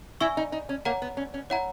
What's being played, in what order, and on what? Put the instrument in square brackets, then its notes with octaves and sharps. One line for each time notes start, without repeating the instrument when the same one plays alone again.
[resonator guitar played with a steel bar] E4 [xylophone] E5 G#5 C#6 E6
[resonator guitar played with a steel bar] D#4
D#4
C#4
[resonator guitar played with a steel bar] A#3 [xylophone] C#5 F#5 A#5
[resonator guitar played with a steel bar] B3
C#4
C#4
[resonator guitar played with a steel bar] E4 [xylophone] C#5 F#5 A#5